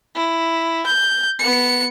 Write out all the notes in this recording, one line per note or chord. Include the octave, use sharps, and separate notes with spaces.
E4
G6
B3 C#7